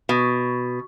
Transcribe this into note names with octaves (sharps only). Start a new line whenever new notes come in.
B2